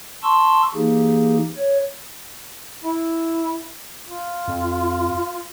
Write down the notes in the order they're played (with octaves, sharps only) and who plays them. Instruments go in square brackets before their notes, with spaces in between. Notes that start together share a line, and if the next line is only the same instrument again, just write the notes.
[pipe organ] A5 C6 C#6 E6
E3 A#3 D#4 G4 G#4
C#5
[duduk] E4
F4
[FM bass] F2